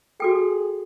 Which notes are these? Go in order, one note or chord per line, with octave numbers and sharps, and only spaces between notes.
F#4 G#4 A4 G5